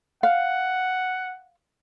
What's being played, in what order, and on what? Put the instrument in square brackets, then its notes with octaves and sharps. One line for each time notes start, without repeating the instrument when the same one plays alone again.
[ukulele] F5 [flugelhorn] F#5